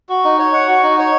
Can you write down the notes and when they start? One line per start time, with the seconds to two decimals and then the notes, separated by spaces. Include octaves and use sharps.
0.09 F#4
0.24 D#4
0.39 C#5
0.53 F#5
0.68 F#4
0.83 D#4
0.99 C#5